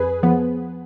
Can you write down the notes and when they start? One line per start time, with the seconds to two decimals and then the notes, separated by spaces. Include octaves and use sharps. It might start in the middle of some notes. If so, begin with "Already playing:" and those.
Already playing: F2 G#4 B4
0.23 F3 B3